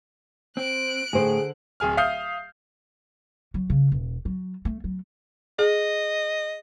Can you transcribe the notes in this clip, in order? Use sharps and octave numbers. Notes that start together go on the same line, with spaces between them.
C4 F#6 D7
A2 D3 G#4 C5 G#5
D1 G#4 G#5 F6
E5 F5 D#6 F6 G6 C7
F#3
C#3
E1
F#3
A3
F#3
G#4 D#5